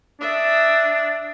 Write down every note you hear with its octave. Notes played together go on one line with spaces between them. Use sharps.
D4 E5 D#6